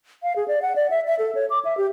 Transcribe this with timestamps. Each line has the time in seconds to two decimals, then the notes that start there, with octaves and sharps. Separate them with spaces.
0.23 F5
0.36 G#4
0.48 D5
0.62 F#5
0.76 D5
0.90 E5
1.07 E5
1.19 A4
1.35 C#5
1.50 D6
1.65 E5
1.77 G4